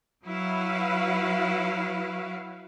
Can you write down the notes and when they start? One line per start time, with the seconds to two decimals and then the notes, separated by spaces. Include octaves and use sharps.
0.25 F#3 E4 F#4 B4 F5